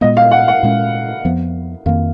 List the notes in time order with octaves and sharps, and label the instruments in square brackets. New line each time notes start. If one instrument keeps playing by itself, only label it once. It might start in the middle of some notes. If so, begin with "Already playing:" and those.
[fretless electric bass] A#2 G#3 B3 [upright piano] D#5
[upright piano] F5
F#5
F#5
[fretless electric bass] A#2 G#3 C#4
F2 F3 B3
[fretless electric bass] F2 D#3 A#3 [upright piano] F5